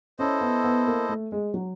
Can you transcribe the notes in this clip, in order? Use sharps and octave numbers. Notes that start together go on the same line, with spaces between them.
C#4 E4 A4 C5 D#5
B3
B3
A#3
A3
G#3
F#3